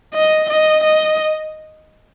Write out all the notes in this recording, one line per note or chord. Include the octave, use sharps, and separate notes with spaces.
D#5
D#5
D#5